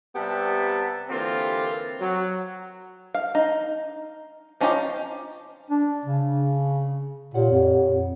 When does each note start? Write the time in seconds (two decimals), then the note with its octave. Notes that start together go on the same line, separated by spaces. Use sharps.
0.15 C3 G3 B3 G4 E5 A5
1.09 D3 E3 A#3 C4 F4 G4
2.00 F#3
3.15 F5
3.35 D#4
4.61 F3 C#4 D#4 F4 G4
5.70 D4
6.05 C#3
7.34 A#2 G4 C#5 F#5
7.51 F2